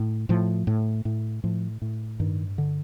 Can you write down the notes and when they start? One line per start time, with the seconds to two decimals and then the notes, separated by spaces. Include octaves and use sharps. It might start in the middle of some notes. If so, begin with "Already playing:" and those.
Already playing: A2
0.29 A2 F3
0.67 A2
1.05 A2
1.44 A2 F3
1.82 A2
2.20 G2 D#3
2.58 D3